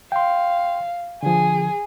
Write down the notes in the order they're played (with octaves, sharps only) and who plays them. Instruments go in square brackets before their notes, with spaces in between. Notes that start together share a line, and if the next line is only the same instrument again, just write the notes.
[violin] F5 [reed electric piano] G5 C6
[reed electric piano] D3 F3 [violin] G#4